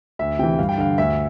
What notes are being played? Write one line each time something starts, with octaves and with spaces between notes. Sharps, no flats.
D2 E5
C3 E3 G5
G2 F5
G5
D3 F5
D2 E5